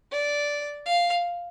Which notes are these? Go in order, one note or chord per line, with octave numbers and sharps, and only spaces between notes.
D5
F5